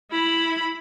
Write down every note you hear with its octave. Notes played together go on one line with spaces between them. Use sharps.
E4 B5